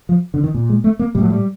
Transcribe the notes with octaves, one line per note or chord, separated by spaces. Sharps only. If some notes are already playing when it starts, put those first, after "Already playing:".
F3
D3
D#3
A#2
G#3
A3
A#3
A2 G3
F#3
G3